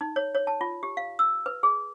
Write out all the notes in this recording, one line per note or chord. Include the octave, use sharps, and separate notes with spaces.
D#4
C#5
C#5
A5
F4
G4
F5
E6
B4
G#4